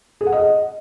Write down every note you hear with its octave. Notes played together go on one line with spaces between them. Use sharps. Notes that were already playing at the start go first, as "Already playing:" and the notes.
G#4
F#5
D#5